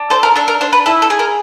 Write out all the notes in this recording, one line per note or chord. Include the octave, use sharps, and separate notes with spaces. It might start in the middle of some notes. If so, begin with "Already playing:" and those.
Already playing: D4
A4 C5
A#4
D4 A4
A#4
D4 C5
B4
E4 A4
A4
G#4
A#4